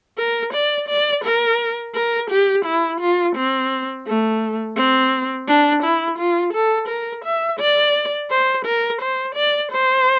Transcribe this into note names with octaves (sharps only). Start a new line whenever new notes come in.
A#4
D5
D5
A#4
A#4
G4
E4
F4
C4
A3
C4
D4
E4
F4
A4
A#4
E5
D5
C5
A#4
C5
D5
C5